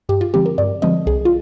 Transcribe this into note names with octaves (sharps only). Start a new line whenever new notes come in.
G2 G4
F4
D3 F3 G#3 C4 G4
A#4
G2 D5
D3 F3 G#3 C4 D#5
C2 G#4
F4